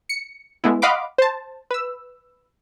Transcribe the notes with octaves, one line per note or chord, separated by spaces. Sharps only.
C#7
G#3 A3 B3 E4
D#5 F5 F#5 B5 C6 D6
C5 A5
B4 E6